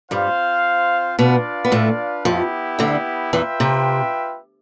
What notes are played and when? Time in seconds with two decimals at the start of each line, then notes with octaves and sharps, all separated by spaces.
0.11 G2 G3 C4 F4 C5 F5
1.18 B2 B3 D4 F4 B4 D5 F5
1.65 B3
1.72 A2 A3
2.25 F2 F3 B3 E4 G4
2.79 D2 D3
3.33 E2 E3 F4 B4 E5 G5
3.60 C3